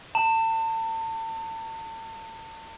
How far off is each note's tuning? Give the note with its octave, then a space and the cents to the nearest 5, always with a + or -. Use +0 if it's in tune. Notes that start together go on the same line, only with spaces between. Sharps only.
A5 +35